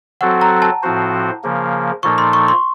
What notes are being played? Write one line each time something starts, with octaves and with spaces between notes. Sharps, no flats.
F#3 C4 F#4 A4 F#5
A#5
A5
A2 F3 C4 F#4 C5
C#3 F3 A#3
A#2 F3 A#3 D#4 A4 C#6
C6
C#6
C6